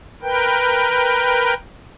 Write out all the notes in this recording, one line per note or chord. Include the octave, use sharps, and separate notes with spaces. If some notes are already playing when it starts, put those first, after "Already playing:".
A#4 B4 G5